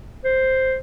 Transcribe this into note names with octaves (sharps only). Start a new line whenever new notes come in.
C5